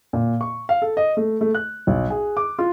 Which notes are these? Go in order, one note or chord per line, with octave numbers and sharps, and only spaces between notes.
A#2
C#6
F5
A4
D#5
A3
A3
F#6
B1
G#4
D6
F4